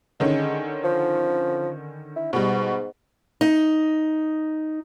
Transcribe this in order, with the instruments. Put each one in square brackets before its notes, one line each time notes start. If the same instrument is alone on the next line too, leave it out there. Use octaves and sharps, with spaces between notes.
[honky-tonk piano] D3 D#3 C#4 [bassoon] G#3
[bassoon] F3
E4
[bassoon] G#2 [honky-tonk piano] B2 G3
[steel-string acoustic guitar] D#4